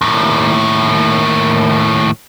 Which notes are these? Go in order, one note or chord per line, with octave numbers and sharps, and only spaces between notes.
D#2 A2